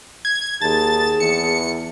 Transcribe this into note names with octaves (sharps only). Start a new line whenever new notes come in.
G#6
D#2 G#4 A5 A6
E2 C#7